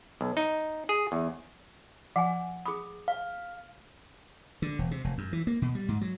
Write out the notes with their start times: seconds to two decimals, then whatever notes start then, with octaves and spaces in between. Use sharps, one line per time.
0.21 B1
0.37 D#4
0.89 G#4
1.12 E2
2.16 F3 F#5 G#5
2.66 G#4 B5 D#6
3.08 F5
4.62 D3
4.79 E1
4.91 C3
5.04 F1
5.18 F#2
5.33 E3
5.47 A#3
5.62 B2
5.75 G3
5.88 G#2
6.01 F#3